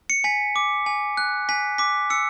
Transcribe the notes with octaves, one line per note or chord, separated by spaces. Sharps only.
C#7
G#5 B6
D6
G#5
F#6
G#5 B6
D6 B6
E6 C#7